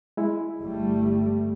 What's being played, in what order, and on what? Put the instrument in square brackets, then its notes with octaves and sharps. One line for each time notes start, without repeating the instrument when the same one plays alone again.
[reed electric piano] G#3 E4
[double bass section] G1 G3 A3